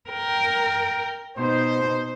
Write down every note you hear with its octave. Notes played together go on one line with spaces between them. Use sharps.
A#4 G5
B2 D#4 C5